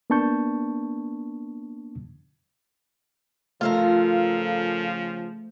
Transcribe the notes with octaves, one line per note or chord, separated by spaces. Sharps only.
A#3 B3 D4 A5 C#6 G6
C#3 F3 A3 F4 A4 A#4 F5